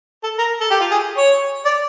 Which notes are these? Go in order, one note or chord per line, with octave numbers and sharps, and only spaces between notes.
A4
A#4
A4
G4
F4
G#4
C#5
D5